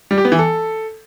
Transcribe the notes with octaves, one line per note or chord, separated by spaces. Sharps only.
G3
G4
B3
E3
A4